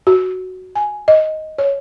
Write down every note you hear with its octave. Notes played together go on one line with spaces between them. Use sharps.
F#4
G#5
D#5
C#5